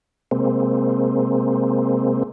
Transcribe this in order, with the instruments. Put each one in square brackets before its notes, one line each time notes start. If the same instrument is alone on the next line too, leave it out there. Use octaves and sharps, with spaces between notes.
[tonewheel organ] C3 G#3 A#3 C4